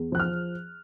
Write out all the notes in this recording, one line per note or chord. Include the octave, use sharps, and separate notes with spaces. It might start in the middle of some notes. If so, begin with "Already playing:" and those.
Already playing: E2
F3 F#6
F6